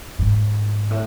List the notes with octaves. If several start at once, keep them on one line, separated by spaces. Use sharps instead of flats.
G#2
A2